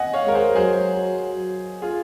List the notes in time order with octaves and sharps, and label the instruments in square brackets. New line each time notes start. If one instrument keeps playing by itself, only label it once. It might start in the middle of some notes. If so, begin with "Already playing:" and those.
Already playing: [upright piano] D#5 F#5 G#5
C#5 F5
[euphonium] G#3 [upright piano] A#4
[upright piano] G#4 C5
[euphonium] F#3 [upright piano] G#4 C5
[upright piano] F4 G#4